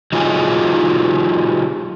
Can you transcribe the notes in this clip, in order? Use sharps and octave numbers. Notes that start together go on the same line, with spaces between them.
F#3 D#4 F4 G4 G#4